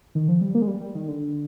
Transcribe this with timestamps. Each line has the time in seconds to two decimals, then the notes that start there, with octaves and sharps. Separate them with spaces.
0.15 D#3
0.28 F3
0.41 G3
0.55 A#3
0.62 G#3
0.67 G3
0.81 G3
0.95 D#3
1.08 D3